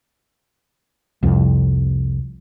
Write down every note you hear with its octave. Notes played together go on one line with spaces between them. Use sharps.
C2 F2